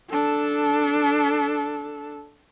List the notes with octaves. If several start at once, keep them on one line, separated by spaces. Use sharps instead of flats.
D4 A4